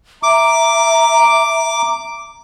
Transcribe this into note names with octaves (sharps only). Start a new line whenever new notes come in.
E5 A#5 D6